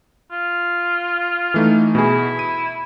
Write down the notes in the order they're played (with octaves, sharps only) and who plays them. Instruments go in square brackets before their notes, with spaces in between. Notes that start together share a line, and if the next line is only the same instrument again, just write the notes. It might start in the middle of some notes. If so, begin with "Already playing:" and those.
[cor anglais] F4
[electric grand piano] E3 A3 D#4
[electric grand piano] B2 G#4 [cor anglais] E4
[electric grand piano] D#7